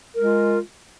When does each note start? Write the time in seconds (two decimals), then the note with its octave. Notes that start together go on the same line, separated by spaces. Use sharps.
0.15 A#4
0.18 G#3
0.22 F4